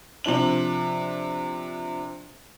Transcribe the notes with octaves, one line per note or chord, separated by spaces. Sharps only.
C3 F3 D4 F#7